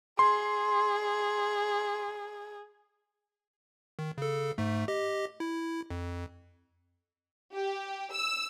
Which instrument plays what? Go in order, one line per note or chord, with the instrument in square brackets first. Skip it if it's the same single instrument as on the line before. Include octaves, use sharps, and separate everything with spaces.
[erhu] G#4 [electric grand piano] C6
[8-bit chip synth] D#3
C#3 A4
G#2 A3
G4 D#5
E4
F2
[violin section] G4
E6